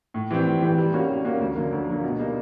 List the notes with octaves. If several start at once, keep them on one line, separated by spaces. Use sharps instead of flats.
A2
E3 G3 C4
A2
E3 G3 C4
G3
A#3 C#4 F#4
G3
A#3 C#4 F#4
D2
D3 F#3 A#3
D2
D3 F#3 A#3
B2
G3 A#3 D#4